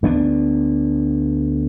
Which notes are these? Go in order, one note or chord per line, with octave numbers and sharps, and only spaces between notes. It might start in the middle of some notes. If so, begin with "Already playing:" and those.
D2 B3 C#4 D4